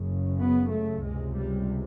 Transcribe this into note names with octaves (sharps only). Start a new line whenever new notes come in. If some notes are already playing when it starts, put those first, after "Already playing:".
Already playing: F#1 F#2 C#3
B3
A3
C#2 C3 G#3
G3